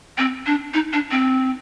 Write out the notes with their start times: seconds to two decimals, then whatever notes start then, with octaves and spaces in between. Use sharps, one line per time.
0.18 C4
0.46 D4
0.74 D#4
0.93 D4
1.11 C4